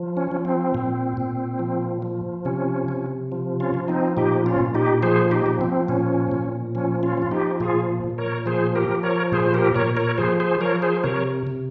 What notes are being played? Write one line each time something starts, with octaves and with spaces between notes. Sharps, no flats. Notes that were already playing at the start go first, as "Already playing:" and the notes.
Already playing: F3
C#4
F3
C4
A#2
A#2
F3
F3
C3 C#4
C3
F3
C#4 F4
F3
C4 D#4
A#2 D#4 G4
C#4 F4
A#2
D#4 G4
F3 G#4 C5
D#4 G4
F3
C4
A#2 C#4
A#2
F3 C#4
C#4 F4
F3 F4
D#4 G4
A#2 F4 G#4
A#2
A#4 C#5
F3 G#4 C5
G4 A#4
F3
A#4 C#5
A#2 G#4 C5
C5
G4 A#4
A#2 A#4 C#5
A#4 C#5
F3 G#4 C5
G#4 C5
F3 A#4 C#5
G#4 C5
C3 A#4 C#5
C3